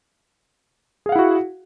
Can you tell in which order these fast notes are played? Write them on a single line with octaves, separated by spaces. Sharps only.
G#4 F5 F#5 E4 F#4